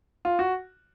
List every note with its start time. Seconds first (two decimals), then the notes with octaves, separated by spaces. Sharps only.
0.25 F4
0.39 F#4